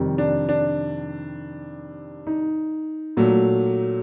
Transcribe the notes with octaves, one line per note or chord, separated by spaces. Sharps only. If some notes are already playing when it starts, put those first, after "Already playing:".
Already playing: F2 C3 D#3 G3
D4
D4
D#4
A#2 F#3 A3